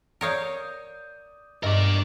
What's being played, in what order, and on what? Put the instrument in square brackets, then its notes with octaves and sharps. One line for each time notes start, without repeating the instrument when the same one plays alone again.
[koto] A#4 C#5 F5 [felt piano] D5 D#6 G6
[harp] G2 [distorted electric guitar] A#4 D5 [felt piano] D#5